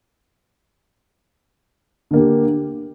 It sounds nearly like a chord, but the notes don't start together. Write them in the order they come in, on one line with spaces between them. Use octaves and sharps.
D3 A#3 G4